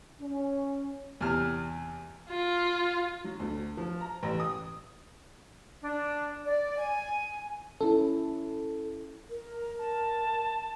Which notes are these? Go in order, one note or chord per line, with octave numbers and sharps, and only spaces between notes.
C#4
E2 C3 A5 F6
F4
F#3
D2
F3
A#5
A1
D#6
D4
D5
G#5
C#4 E4 A4
A#4
A#5
A5